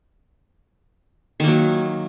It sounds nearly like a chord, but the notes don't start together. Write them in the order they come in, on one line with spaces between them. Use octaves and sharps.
D#3 A#3 F#3